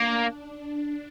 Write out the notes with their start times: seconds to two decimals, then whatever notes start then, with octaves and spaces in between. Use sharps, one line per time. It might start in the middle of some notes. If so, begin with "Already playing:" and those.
Already playing: A#3 D4
0.29 D4